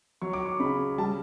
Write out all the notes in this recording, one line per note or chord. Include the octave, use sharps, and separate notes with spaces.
F#3 C#6
D6
C#6
C#3 B5
G3 A5